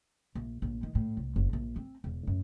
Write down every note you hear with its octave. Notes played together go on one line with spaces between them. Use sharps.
A#1
A#1
D#3
A2
C2
F#1
A#1
C4
E1
F#2